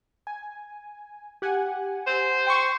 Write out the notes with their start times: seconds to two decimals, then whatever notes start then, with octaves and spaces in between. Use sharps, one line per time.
0.27 G#5
1.42 G4 F#5 G#5
2.07 C5
2.47 G5 C6 C#6